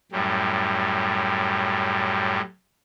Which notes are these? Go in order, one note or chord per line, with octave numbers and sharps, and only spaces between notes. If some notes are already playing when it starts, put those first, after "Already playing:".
F#2 A2 G3